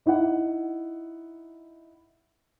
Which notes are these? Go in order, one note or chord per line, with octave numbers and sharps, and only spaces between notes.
D#4 E4 E5 F#5